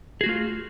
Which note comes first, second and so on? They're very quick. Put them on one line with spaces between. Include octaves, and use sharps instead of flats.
G#4 F#4 A3 F4